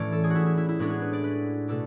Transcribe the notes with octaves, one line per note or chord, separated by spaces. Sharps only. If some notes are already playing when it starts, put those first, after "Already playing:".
Already playing: A2 E3 A3 C#4 D5
A4
G#4
F#4
E4
E4
E4
E4
A2 G#3 B3 D4 F#4
G#4
B4
D5
B4
B2 A3 D4 A4